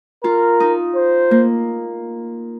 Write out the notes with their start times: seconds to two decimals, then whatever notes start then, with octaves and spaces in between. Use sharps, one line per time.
0.24 F4 A#4
0.60 D#4
0.96 C5
1.31 A#3